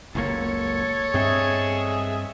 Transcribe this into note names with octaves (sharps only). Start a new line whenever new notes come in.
F#1 C#2 A#3 A4 C#5
G2 C4 G#4 D#5 E5